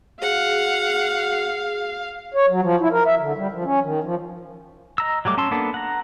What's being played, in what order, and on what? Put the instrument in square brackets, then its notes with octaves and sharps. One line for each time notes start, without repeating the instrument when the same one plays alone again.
[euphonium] F#4 [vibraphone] G#4 [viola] F5 [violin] F#5
[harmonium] C#5
F#3
F3
E4
A#4
E5
D3
G3
F3
C#4
D#3
F3
[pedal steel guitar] D#5 A#5 E6
F#3 G3 A3 D6
C#4 A5 C6 E6
A#3 B3 D4 A4
F#5 A#5